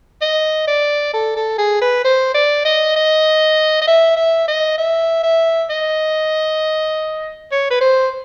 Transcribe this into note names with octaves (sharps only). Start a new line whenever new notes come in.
D#5
D5
A4
A4
G#4
B4
C5
D5
D#5
D#5
D#5
E5
E5
D#5
E5
E5
D#5
C#5
B4
C5